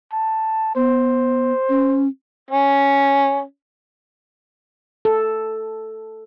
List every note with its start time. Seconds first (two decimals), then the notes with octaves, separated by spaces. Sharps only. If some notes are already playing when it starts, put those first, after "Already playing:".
0.13 A5
0.76 B3 C5
1.69 C#4
2.51 C#4
5.05 A4